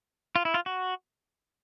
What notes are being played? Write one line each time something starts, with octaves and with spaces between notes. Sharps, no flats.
F4
E4
F4
F#4